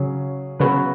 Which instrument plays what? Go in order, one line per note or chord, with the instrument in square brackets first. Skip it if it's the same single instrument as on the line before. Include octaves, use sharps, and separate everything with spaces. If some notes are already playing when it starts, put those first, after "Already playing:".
Already playing: [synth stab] C#3 [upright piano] F#3 C#4 G#4
[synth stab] C#3 [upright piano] F#3 B3 F#4 B4